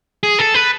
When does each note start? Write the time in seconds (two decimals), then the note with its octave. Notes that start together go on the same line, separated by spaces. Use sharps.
0.23 G#4
0.39 A4
0.54 B4